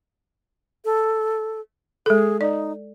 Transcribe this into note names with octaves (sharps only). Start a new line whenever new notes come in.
A4
G#3 G#4 A4
D#4 D5